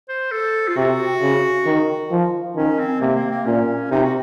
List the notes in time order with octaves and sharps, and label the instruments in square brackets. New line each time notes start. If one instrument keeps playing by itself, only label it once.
[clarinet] C5
A4
F4
[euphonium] C3 [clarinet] F#4
[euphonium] C#3
D#3
F3
[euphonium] D#3 [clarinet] C#4
[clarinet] C4
[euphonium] C3 [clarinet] A#3
[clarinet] A#3
A#3
[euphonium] A#2 [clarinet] C#4
[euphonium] C3 [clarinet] D#4
[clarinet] F#4